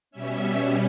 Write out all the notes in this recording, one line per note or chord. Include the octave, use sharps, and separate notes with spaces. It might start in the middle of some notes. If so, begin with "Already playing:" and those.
B2 G3 C#4 E5